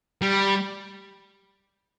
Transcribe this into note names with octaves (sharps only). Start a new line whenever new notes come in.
G3